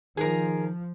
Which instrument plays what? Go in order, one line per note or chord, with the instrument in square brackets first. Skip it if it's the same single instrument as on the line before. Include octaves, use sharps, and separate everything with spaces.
[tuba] D#3 [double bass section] F3 [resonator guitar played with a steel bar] G#4 A#4